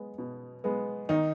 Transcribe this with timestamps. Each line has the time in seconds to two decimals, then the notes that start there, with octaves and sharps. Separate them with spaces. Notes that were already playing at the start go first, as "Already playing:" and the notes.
Already playing: G#3 B3
0.18 B2
0.64 G#3 B3
1.09 D#3 D#4